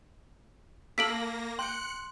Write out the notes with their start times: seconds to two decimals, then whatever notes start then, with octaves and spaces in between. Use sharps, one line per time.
0.98 A#3 A4 F5 E6 A#6 B6 D7 F#7
1.59 G5 C6 F#6 C#7